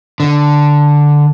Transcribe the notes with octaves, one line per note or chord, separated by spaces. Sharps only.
D3